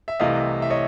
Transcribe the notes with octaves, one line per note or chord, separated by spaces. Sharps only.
E5
C2 C3 E3 A3 D#5 F5
E5
C#5 D#5